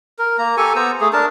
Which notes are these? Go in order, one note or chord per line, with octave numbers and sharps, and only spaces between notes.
A#4
A#3 A#5
G4 A4 G#5 C#6
B3 C5 A#5 E6
A3 G#4
D4 A#4 A5